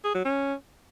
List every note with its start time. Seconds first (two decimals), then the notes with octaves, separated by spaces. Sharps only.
0.04 G#4
0.15 F#3
0.25 C#4